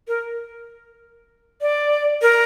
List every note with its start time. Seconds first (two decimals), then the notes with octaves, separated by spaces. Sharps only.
0.08 A#4
1.61 D5
2.22 A#4